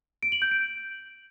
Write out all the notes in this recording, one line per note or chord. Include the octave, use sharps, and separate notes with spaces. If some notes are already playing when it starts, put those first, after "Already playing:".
D7
F#7
G6
D7